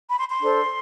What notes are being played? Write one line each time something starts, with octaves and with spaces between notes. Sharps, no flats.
B5
C6
C6
D4 A4 C5